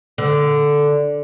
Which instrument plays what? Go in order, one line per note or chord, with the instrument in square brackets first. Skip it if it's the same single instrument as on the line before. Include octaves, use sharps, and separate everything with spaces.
[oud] D3